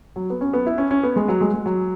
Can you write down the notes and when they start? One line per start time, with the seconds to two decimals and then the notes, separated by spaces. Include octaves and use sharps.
0.16 F#3
0.30 B3
0.41 C#4
0.53 B3
0.66 E4
0.78 C#4
0.91 C#4
1.03 B3
1.16 G#3
1.28 F#3
1.41 G#3
1.54 G#3
1.66 F#3